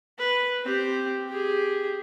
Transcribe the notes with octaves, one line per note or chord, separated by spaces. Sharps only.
B4
C4 G4
G4 G#4